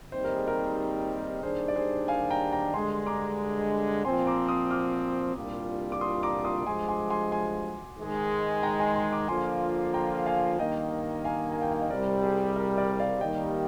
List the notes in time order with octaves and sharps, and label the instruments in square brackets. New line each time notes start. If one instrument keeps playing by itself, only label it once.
[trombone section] D#2 D#3 G3 C4 D#4 [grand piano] C5
[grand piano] A#4
G#4
A#4
[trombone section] D#2 D#3 G3 D4 [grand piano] G#4 C5
[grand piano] D5
G#4 C5
F5 G#5
G5 A#5
G5 A#5
[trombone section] G2 D3 G#3 [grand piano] G#5 C6
[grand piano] A#5 D6
[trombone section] A#2 F3 C4 [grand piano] G#5 C6
[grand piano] A#5 D6
C6 D#6
D6 F6
[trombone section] C2 A#2 G3 D4 F4
[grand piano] D6
C6 D#6
A#5 D6
C6 D#6
[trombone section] G2 F3 G#3 [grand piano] G#5 C6
[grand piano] G#5 C6
G#5 C6
G#5 C6
[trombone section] G#2 D#3 G#3
[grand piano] G5 A#5
G#5 C6
G#5 C6
A#5 D6
[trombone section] D3 F3 A#3 F4 [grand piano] G#5 C6
[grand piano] G5 A#5
F5 G#5
[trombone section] G2 D#3 A#3 [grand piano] D#5 G5
[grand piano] F5 G#5
G#5
G5
F5
D#5
[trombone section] C2 C3 G3 [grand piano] A#4 D5
[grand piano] G#4 C5
A#4
A#4 D5
D5 F5
[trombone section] D#2 D#3 G3 A#3 [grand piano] D#5 G5